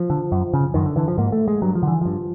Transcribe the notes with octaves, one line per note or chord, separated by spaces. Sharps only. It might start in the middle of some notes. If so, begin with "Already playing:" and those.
Already playing: F3
D3
F#2
C#3
F#2 D#3
D3
D3 E3
F3
G#2 A#3
A3
G#3
G2 F#3
F3
D3 E3
G2 F3